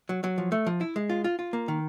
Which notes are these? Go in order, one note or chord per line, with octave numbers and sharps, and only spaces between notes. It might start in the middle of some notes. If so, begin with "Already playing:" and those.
F#3
F#3
F3
A3
F3
E4
G#3
F4
F4
F4
A#3
D#3